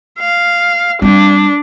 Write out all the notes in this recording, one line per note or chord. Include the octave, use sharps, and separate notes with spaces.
F5
G3 C4 D4